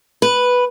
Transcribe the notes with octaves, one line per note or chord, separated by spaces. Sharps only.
B4